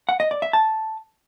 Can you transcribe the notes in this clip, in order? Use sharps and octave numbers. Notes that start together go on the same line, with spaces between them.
F#5
D#5
D5
E5
A5